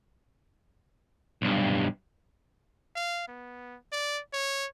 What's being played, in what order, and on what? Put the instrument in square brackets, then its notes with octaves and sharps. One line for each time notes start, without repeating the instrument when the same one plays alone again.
[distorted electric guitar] B1 G2
[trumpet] F5
B3
D5
C#5